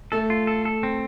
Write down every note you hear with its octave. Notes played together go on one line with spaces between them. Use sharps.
A3 A4
F4
A4
A4
C4